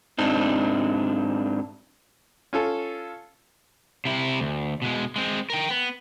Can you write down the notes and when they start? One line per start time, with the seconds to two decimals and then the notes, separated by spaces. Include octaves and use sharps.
0.19 G#2 C4 D4 D#4
2.53 C#4 F4 A4
4.05 C3 E4
4.40 D2
4.82 B2 G#3
5.16 G#3 C4
5.50 A#4 G5
5.70 B3